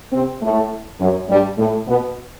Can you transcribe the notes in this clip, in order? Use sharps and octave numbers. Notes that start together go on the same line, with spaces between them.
C3 C4
A2 A3
F#2 F#3
G2 G3
A2 A3
B2 B3